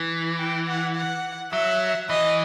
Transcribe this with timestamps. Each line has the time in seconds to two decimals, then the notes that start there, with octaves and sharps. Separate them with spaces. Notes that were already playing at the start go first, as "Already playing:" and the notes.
Already playing: E3
0.39 G5
0.67 F#5
0.96 F#5
1.52 F#3 E5
2.10 E3 D#5